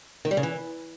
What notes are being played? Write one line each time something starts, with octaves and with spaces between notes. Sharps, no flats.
D#3
G3
C#3
E3